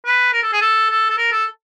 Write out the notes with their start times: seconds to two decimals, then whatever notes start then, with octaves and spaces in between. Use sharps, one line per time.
0.05 B4
0.33 A#4
0.43 A4
0.53 G#4
0.61 A4
0.90 A4
1.10 A4
1.18 A#4
1.32 A4